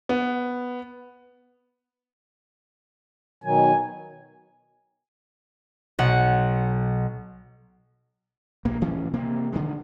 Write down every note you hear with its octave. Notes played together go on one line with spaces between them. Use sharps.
B3
B2 D#3 F#3 G#5
B1 F#5
A#1 G2 A#3
D1 E3 C#4
C3 A#3 C4
D3 D#3 G#3